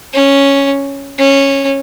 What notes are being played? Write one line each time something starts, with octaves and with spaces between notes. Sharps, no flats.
C#4
C#4